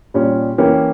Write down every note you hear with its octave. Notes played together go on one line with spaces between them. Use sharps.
A#2 G3 C#4 G4
E3 A#3 C#4 G4 A#4